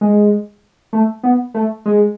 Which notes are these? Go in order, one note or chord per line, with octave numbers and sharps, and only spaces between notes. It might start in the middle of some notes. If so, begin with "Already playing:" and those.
G#3
A3
B3
A3
G#3